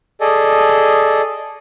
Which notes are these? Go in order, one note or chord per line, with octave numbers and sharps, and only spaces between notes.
G#4 A4 D5 D#5